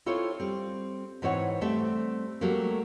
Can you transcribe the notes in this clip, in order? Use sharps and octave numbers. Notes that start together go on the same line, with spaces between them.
C4 E4 F4 A4 C#5
G3 C4
G#2 E3 C4 C#5 F#5
G3 A3 C4 D5 E5
F#3 G3 A3 A#3